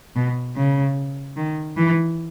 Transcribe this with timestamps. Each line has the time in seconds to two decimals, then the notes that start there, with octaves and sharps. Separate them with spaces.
0.16 B2
0.57 C#3
1.37 D#3
1.77 E3